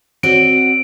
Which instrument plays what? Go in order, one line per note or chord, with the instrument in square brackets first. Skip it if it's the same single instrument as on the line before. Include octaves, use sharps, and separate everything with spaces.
[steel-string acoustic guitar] C4 F#4 D5 [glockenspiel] D7